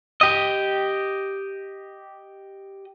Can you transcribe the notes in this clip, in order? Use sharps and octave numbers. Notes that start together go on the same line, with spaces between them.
G4 D#5